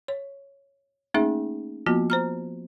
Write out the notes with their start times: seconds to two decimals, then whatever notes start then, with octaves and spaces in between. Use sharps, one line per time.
0.08 C#5
1.14 A3 A#3 C#4 D#4 G#4 E5
1.86 F3 A#3 B3 F4 F#4
2.10 C5 A#5 F6